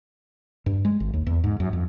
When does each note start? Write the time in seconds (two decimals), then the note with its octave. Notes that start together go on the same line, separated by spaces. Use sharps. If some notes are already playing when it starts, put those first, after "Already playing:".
0.66 G2
0.85 G#3
1.00 G#1
1.14 D#2
1.27 E2
1.44 G#2
1.60 F#2
1.73 F2